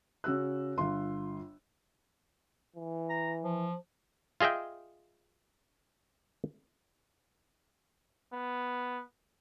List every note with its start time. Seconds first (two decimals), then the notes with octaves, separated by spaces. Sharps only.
0.24 C#3 F#4 E6 F#6
0.78 G1 F4 C6
2.76 E3
3.10 A#5
3.44 F3
4.41 F4 G#4 D#5 E5 G5
8.33 B3